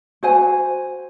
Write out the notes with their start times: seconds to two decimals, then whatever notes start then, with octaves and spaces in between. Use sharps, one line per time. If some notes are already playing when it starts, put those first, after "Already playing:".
0.23 F#4 C5 G#5